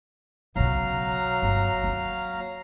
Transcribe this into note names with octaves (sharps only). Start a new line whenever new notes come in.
B1 C#3 F#3 F5 A#5
G1
A#3 C4